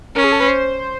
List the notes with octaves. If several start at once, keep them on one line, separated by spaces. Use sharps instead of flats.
C#4 A#4
G#4
A4
B4
C5